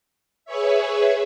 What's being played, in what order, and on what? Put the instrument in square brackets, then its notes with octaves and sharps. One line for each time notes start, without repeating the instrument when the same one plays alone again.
[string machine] G#4 B4 C#5 E5